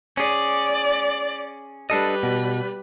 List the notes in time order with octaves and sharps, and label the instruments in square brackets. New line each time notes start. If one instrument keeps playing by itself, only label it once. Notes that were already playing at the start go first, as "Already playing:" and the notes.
[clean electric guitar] C#4 G#4 [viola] D5
[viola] G3 B4 [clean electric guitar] D4 A4 D#5
[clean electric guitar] B2